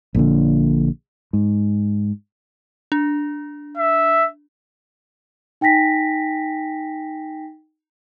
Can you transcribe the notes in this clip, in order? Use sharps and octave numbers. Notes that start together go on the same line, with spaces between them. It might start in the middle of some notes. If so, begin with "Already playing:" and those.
A#1 A#2 D3
G#2
D4
E5
D#4 G5 G#5 A#6 B6